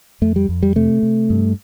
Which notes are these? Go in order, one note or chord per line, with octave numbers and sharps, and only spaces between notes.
F2 A3
G3
F2
G3
C3 A3
C3
G2